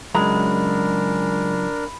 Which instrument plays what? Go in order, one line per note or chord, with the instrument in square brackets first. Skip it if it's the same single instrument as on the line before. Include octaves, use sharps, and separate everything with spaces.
[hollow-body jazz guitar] C#2 F#2 A#5 [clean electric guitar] G#3 [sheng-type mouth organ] D4 A#4 [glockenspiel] B5